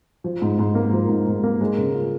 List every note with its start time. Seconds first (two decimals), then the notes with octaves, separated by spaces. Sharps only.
0.24 F3
0.42 G#2
0.59 G#2
0.75 A#3
0.93 F3
1.09 G#2
1.27 G#2
1.43 A#3
1.61 G#3
1.78 C#3
1.95 F4